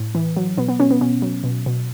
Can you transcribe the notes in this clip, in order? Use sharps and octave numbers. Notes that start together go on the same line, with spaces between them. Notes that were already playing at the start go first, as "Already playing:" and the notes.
Already playing: A2
E3
F#3
B2 B3
B3
B2 C#4
B3
B2 C#4
F#3
B2
B2